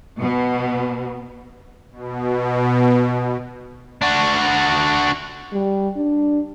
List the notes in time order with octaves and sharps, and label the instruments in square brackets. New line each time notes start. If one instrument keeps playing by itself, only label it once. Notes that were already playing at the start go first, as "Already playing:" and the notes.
[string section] B2
[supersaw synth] B2
[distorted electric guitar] D4 F#4
[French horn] G3
D4